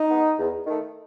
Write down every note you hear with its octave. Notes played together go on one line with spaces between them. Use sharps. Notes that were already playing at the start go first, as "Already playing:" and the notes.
Already playing: D#4
G#3 B3
E2
D#3 A3